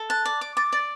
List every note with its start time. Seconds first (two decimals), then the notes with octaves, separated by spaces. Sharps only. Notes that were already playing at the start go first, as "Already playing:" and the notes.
Already playing: A4
0.10 A5 F#6
0.25 D5
0.41 D6
0.57 D6 A6
0.73 D5 A6